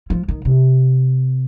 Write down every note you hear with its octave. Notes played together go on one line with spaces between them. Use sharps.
F3
D#3
C3